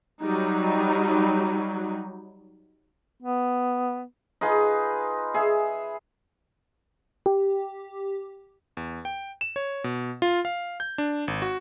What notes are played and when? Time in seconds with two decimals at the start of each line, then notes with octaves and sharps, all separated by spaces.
0.22 F#3 G3 D#4
3.22 B3
4.41 D#4 F4 G#4 B4
5.34 G#4 E5
7.26 G4
8.77 E2
9.05 G5
9.41 E7
9.56 C#5
9.84 B2
10.22 F4
10.45 F5
10.80 G6
10.98 D4
11.28 G#1
11.42 F#4